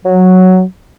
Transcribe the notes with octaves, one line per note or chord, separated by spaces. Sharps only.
F#3